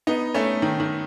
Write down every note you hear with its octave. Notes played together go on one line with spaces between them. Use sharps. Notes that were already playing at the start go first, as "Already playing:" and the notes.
B3 D#4
A3 C#4
D#3
D#3